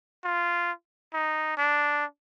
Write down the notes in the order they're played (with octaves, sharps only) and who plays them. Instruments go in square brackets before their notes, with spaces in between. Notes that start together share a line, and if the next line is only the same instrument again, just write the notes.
[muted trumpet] F4
D#4
D4